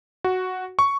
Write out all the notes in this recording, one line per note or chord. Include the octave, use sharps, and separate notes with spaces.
F#4
C#6